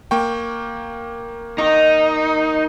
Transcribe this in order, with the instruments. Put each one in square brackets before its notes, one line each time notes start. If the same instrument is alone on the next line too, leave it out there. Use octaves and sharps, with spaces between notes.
[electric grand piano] A#3 G5 [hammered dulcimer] C#6
[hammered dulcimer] D#3 [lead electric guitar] D#4